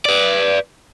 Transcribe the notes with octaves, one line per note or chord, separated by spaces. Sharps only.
B4 D5